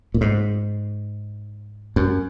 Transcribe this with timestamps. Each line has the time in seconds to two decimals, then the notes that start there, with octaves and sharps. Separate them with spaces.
0.14 A#2
0.21 G#2
1.96 F#2